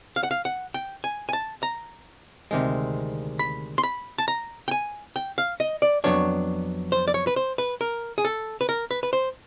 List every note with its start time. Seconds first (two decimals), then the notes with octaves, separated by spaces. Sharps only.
0.16 F5
0.23 F#5
0.31 F5
0.45 F#5
0.74 G5
1.04 G#5
1.29 G#5
1.33 A5
1.63 A#5
2.51 D2 C3 D#3 G#3
3.39 B5
3.78 C6
3.83 B5
4.18 A5
4.28 A#5
4.68 G5
4.71 G#5
5.16 G5
5.38 F5
5.60 D#5
5.82 D5
6.04 F2 C#3 F#3 B3 D4 C#5
6.92 C5
7.08 D5
7.14 C#5
7.27 B4
7.36 C5
7.58 B4
7.81 A#4
8.18 G#4
8.25 A4
8.61 B4
8.69 A#4
8.91 B4
9.03 B4
9.13 C5